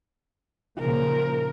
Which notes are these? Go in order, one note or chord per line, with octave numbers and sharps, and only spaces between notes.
A#2 C#3 F3 A#4